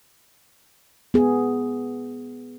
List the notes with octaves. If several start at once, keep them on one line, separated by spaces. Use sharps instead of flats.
B3 G#4